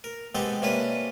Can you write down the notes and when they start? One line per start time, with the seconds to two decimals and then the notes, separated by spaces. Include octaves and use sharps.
0.04 A#4
0.35 G#3 B3 C4 G4 A4
0.62 C3 A#3 C#4 D4 B4